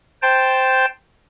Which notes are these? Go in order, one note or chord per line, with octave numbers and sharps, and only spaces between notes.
C5 G5 A5